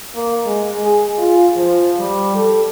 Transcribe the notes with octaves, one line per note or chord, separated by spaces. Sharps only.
A#3
G#3
G#4
F4
F3
G3
A4